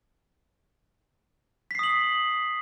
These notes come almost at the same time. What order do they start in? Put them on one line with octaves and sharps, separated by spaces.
B6 C7 D#6 F#7